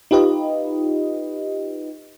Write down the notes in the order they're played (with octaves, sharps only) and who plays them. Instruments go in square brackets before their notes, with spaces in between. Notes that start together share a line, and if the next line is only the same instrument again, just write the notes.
[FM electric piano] D#4 F4 G4 B4 D#5